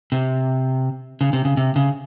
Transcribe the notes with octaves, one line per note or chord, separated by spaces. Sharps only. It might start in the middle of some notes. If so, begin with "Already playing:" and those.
C3
C#3
C3
C#3
C3
C#3